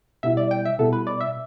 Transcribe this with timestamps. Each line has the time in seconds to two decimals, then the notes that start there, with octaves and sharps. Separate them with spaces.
0.23 B2 G3 B3 E4 E5
0.37 D5
0.51 G5
0.65 E5
0.78 B2 G3 B3 E4 A4
0.93 B4
1.07 D5
1.21 E5